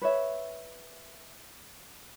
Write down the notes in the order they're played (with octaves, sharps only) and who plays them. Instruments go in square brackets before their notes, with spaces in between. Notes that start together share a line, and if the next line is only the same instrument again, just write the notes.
[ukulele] B4 C#5 E5